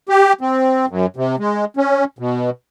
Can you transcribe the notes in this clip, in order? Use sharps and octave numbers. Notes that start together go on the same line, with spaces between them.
G4
C4
F#2
C3
G#3
C#4
B2